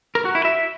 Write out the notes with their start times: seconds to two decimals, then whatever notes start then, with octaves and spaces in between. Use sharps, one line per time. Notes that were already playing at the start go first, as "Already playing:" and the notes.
0.15 A#4
0.25 F#4
0.35 E4
0.45 E5